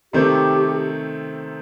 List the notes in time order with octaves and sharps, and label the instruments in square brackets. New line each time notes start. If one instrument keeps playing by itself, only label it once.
[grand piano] C3 D#3 A3 C4 [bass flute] G4